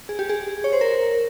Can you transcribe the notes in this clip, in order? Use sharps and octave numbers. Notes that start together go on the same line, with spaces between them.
G#4
G4
G#4
C#5
C5
A#4